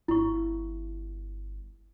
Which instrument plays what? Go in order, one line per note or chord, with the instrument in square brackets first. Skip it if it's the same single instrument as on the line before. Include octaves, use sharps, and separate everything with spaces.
[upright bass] G1 [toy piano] E4 C#6